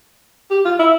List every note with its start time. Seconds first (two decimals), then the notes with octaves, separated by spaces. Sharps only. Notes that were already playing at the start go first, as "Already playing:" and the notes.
0.51 G4
0.65 F4
0.79 E4